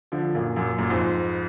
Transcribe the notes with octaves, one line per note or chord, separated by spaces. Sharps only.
D3 F3
F#2 A#2
F#2 A#2
F#2 A#2
F2 G#2